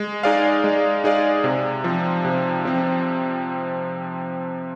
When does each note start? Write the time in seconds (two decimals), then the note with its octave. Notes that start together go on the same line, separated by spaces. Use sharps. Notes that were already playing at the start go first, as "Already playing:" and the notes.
Already playing: G#3
0.23 D#4 G#4 D5 F5
0.64 G#3
1.04 D#4 G#4 D5 F5
1.44 C3
1.84 F3 C4
2.25 C3
2.65 F3 C4